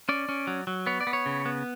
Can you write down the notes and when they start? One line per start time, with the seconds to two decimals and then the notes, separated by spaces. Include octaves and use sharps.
0.09 C#4 D5
0.29 C#4
0.47 F#3
0.67 F#3
0.86 B3 C#5
1.01 D5
1.07 B3
1.13 C#5
1.26 C#3
1.45 B3